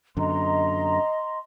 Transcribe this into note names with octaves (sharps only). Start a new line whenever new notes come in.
F#2 D3 D#5 A#5 C6